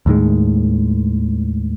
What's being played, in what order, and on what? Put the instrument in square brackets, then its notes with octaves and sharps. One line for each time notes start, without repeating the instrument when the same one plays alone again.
[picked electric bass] D#2 A2 D#3 G#3